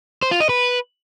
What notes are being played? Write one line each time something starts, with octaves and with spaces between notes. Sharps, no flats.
C5
F4
D#5
B4